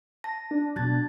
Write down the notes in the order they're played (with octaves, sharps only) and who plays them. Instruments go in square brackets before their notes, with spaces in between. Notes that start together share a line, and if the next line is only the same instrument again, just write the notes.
[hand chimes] A5 A#6
[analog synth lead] D4
[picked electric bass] B2 F#3 [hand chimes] F#6 G#6 A6